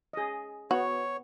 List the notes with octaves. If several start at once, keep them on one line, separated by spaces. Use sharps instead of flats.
G#4 D#5
B3 F#4 C#5